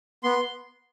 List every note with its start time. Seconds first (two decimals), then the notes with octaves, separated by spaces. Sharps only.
0.23 B3 C6